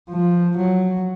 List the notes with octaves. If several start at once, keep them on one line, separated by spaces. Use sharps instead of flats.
F3
F#3